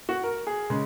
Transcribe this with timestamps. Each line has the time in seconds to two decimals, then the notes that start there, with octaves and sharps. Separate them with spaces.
0.09 F#4
0.24 A#4
0.47 G#4
0.70 C#3 G#3